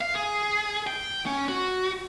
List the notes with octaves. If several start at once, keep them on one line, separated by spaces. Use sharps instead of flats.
F5
G#4
G5
C#4
F#4